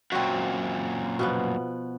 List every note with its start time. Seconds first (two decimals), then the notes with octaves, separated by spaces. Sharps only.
0.12 F#2 A#2 C4 F#4
1.19 B2 F3 B3